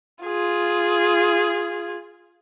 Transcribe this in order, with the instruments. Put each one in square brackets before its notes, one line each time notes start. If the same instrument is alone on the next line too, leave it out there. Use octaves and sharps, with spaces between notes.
[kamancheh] F4 G#4